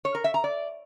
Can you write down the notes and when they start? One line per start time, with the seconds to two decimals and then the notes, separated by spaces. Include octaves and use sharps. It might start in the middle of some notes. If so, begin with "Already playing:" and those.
0.05 C#5
0.15 A#4
0.24 E5
0.34 A#5
0.44 D5